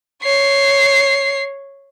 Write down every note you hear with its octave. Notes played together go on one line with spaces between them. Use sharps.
C#5 C7